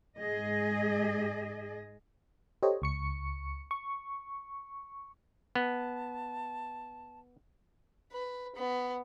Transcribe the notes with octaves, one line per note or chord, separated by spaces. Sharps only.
G#2 G#4 D#5
G4 A4 C5 C#5 D#5
C#2 C#6 C#7
C#6
B3 A5
B4
B3